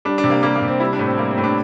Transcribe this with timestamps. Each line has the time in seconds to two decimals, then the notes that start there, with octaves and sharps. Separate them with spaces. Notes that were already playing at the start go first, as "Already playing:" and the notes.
0.05 G3 D4
0.18 D4
0.24 C3
0.30 A#3
0.43 G3 A#3
0.56 A#3
0.62 C3
0.68 C4
0.80 G3 E4
0.93 D4
0.99 A2
1.06 C4
1.18 G3 A#3
1.31 C4
1.38 A2
1.44 D4